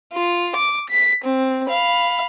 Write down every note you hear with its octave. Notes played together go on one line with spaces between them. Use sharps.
F4
D6
B6
C4
F5 B5